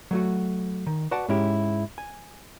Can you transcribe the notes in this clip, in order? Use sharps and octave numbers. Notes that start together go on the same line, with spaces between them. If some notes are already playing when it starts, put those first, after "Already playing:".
F#3 A3 F#4
D#3
F#4 B4 D5 F#5 A5
G#2 G#3 C#4 E4 G4
G#5